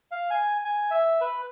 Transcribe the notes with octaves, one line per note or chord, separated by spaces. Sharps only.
F5
G#5
G#5
E5
B4